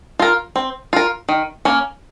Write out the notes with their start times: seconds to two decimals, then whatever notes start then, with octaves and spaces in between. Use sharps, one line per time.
0.19 F4 A#4
0.56 C4
0.93 F4 A#4
1.29 D#3
1.65 A#3 C#4